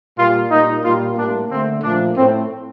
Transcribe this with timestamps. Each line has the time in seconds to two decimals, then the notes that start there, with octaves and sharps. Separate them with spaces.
0.19 A#2 G3 A#3 F4
0.51 A#2 G3 A#3 D#4
0.84 A#2 G3 A#3 F4
1.18 A2 G3 A#3 D4
1.50 D3 A3 C4
1.83 A#2 F3 A3 D4
2.17 A2 A3 C4